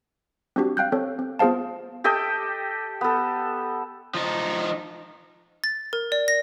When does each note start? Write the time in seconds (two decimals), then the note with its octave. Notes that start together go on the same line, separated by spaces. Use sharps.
0.56 C4 D4 F#4 G4
0.77 F5 G5 F#6 G6
0.92 C4 A4 C#5
1.19 C4
1.39 B3 F4 G#4 C5 F5 A5
2.04 G4 A4 D#5 G5
3.01 B3 A4
4.14 F3 D#4
5.64 A6
5.93 A#4
6.12 D5
6.28 A#6